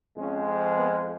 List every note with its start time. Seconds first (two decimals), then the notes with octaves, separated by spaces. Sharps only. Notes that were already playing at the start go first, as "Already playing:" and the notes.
0.17 F2 F3 G#3 C#4
0.76 B3